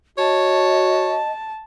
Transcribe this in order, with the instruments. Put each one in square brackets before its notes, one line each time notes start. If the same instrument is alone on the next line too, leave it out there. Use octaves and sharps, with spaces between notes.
[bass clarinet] F#4 [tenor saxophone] C#5 [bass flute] D#5 [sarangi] A5